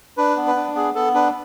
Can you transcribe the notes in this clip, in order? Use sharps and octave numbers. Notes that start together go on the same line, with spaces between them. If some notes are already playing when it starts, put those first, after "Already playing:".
D4 B4
B3
B4
D4
B3 G#4
B3 A4
D4 B4